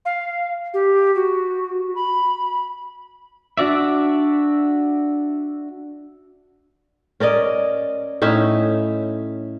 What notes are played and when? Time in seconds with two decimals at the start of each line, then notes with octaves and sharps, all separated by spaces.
0.05 F5
0.74 G4
1.16 F#4
1.95 B5
3.57 D4 F#4 D5 E5
7.20 C#4 A#4 D5 D#5
8.22 A2 C#4 D#4 E5